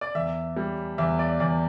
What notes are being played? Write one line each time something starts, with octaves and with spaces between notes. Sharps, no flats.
D5
E2 E5
G3
E2 E5
D5
E2 D5